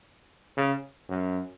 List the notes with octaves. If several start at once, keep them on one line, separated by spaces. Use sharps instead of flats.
C#3
F#2